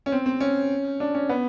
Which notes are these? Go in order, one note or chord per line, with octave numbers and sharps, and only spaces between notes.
C#4
C4
C4
C#4
D4
C#4
B3